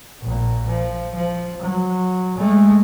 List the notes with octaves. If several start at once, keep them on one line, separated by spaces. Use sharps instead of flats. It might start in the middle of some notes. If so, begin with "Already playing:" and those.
A#1 A#2
F3
F3
F#3
G#3 A3